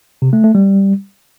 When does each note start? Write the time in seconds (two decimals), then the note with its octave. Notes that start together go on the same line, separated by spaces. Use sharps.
0.22 C3
0.33 A3
0.44 A3
0.55 G3